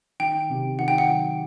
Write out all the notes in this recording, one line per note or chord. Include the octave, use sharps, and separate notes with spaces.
D#3 G5
C3
D#3 F#5
G5
F#5
F#3